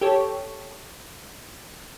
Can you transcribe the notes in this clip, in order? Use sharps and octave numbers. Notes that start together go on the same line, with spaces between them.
G4 A4 C#5